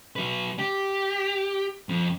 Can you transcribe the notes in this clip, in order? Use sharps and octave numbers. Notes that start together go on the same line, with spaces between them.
F#3 B4
G4
F2